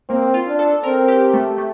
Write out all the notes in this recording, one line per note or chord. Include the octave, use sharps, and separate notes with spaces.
A#3 C4
F4
D4
A4
C4 A#4
G4
A3
A3